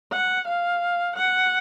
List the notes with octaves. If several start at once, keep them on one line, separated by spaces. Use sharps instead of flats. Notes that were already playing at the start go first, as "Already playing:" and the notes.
F#5
F5
F#5